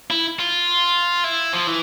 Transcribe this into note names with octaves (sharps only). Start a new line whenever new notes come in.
E4
F4
E4
F3
E3